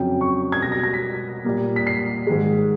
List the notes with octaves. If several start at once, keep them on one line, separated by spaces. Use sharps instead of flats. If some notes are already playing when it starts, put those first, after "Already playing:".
Already playing: F2 C#3 F#3 G5
C#6
G#6
B2 G3 B3 A#6
A#6
A#6
B6
A#2 G3 A#3
B6
C7
G#2 D#3 G#3